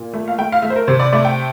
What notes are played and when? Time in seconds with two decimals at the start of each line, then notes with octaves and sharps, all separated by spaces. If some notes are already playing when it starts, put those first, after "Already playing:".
Already playing: A#2
0.13 A3
0.28 F5
0.38 A3 G5
0.52 F5
0.62 A3 E5
0.70 C5
0.76 A#4
0.87 C3 C5
1.00 D5
1.13 A3 D5
1.25 G5